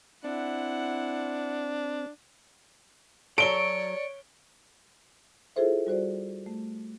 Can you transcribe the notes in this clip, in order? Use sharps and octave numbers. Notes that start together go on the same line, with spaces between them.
C4 D4 E4 F#5
F#3 A4 C#5 D5 D7 G7
E4 F4 G#4 A4 C5 E5
G3 F#4 C5 D5
A3